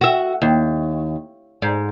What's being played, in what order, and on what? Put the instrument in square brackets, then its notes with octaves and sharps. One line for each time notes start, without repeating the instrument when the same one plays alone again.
[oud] F#4 E5
D#2
G#2